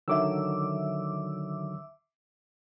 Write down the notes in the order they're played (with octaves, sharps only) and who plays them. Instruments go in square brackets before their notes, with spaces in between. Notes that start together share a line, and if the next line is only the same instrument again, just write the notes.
[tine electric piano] D3 D#3 F#3 [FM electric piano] E5 D6 E6